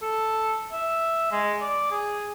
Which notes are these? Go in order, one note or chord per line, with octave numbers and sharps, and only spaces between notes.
A4
E5
G#3
D5
G#4